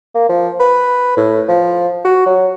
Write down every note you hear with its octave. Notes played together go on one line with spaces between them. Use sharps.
A#3
F3
B4
A2
F3
F#4
F#3